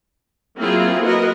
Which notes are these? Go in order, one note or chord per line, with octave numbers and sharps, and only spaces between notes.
F#3 A#3 C4 E4 F4 G#4
F#4 A#4 B4 D#5